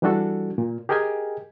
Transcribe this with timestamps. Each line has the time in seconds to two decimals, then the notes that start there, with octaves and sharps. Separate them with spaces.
0.02 E3 G3 D4 F#4 A4
0.58 A#2
0.89 G4 G#4 A#4 D#5 G5 G#5